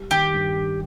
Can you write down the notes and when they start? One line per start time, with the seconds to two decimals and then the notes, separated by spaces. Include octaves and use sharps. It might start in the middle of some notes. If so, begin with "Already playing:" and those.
Already playing: G3
0.11 D#3 G4
0.34 G2
0.56 D4